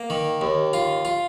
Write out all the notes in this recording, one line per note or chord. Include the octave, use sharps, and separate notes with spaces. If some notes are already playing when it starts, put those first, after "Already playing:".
Already playing: A#3
D#3
D#2
F4
F4